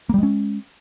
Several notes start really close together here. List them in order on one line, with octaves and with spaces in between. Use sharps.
A#3 G3 G#3 C#4